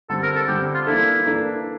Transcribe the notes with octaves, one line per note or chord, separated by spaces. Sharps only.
D3 G3 C4 A4
A#4
A4
D3 G3 C4 G4
F4
E3 A#3 D4 E4 A4
E3 A#3 D4 A4